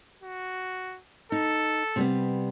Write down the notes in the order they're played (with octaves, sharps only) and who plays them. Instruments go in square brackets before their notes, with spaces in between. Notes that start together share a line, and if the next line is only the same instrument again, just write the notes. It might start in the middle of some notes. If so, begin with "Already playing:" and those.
[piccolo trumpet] F#4
[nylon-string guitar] D#4 [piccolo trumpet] A4
[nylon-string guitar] C3 G3 B3